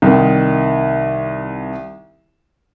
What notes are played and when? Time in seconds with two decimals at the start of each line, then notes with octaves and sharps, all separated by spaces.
0.02 C2 D#3